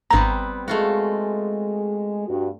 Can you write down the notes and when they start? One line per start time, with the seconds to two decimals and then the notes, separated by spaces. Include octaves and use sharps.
0.10 G#1 G3 B3 C4 A#5
0.68 G#3 A3 F4 F#4
2.27 G2 F#4